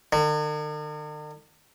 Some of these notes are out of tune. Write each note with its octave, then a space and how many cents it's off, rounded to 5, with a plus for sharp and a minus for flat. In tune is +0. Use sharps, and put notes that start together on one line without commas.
D#3 -45